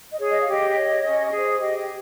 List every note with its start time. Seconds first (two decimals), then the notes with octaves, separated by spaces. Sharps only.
0.10 D#5
0.19 G#4 C#5
0.28 D#5
0.40 F5
0.47 G4 D#5
0.75 C#5
1.03 C#4
1.30 G#4
1.36 C5
1.59 G4 D#5